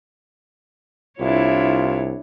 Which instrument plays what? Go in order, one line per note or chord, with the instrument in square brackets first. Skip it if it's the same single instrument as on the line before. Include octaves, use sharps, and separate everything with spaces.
[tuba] C2 [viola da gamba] D4 E4 C#5 [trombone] F4